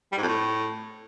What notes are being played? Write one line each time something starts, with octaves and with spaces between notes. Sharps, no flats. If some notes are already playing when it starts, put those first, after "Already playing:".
G3
G#2
F2
A2